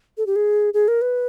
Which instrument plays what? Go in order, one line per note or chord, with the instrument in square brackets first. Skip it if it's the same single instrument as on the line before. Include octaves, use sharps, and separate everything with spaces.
[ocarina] A4
G4
G#4
G#4
A#4
B4